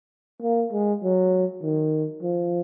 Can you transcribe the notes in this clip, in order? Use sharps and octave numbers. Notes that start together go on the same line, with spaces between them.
A#3
G#3
F#3
D#3
F3